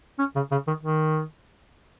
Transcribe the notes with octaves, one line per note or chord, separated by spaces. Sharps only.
C#4
C#3
C#3
D#3
D#3